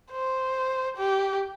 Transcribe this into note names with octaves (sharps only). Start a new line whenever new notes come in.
C5
G4